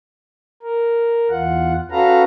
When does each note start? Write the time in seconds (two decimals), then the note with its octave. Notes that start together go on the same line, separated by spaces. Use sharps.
0.63 A#4
1.30 E2 F4 F#5
1.91 C#4 F#4 A4 B4 F5 A#5